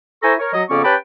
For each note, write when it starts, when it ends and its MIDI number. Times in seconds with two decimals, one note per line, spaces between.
0.22 0.33 64
0.22 0.33 69
0.22 0.33 72
0.22 0.33 80
0.22 0.33 82
0.22 0.33 85
0.40 0.52 70
0.40 0.52 73
0.53 0.63 54
0.53 0.63 75
0.70 0.83 41
0.70 0.83 49
0.70 0.83 59
0.70 0.83 61
0.70 0.83 74
0.70 0.83 85
0.84 0.95 61
0.84 0.95 67
0.84 0.95 71
0.84 0.95 79
0.84 0.95 81
0.84 0.95 83